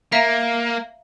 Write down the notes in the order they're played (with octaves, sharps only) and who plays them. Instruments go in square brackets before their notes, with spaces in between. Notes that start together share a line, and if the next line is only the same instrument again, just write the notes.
[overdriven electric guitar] A#3 [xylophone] E5 F5 A#5